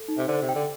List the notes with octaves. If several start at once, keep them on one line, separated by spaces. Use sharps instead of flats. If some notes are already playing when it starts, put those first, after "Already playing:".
Already playing: A4
D#4
C3
D3 C5
C3
G5
D3